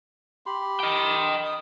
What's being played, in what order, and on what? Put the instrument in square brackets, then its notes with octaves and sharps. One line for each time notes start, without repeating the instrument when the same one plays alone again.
[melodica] G4 B5 C6
[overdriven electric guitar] D#5 G5
[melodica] D#6